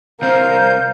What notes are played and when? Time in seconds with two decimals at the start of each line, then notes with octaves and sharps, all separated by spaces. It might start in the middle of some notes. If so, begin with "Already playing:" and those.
0.22 C2 C4 A#4 C5 F5 G6